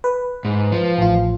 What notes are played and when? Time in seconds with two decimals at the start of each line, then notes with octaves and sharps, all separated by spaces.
0.04 B4
0.45 G#2
0.72 F3
0.98 A1 F4